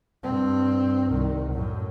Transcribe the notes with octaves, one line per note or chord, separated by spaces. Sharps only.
G2 C4
C2 D#3
F#2 A2